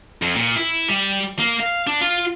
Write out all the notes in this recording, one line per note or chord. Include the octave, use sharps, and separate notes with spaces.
F2
A#2
E4
G3
A#3
F5
D4
F4